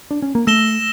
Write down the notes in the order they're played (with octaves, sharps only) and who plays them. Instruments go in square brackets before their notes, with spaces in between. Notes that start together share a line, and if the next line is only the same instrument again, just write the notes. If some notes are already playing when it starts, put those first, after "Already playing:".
[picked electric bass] D4
C#4
A#3
[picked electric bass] A3 [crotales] E6 A#6 E7 G7